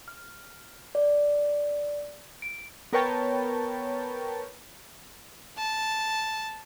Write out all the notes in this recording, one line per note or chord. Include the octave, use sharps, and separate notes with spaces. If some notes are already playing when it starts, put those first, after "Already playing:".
F6
D5
D7
B3 A#4 B4 C#5 G5 A5
A5